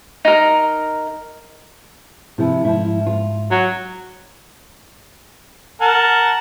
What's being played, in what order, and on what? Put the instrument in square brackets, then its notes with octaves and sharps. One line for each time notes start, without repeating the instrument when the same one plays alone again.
[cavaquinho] D#4 A#4
[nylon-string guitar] C3 F3 [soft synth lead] E4
[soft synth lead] G#2 [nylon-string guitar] F3 E4
[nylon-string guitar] F4
[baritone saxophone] F#3
[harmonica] A#4 F#5 A5